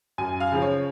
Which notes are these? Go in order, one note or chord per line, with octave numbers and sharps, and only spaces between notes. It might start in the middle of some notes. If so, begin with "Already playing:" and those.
F#2 G#5
F5
C#3 F3
C#5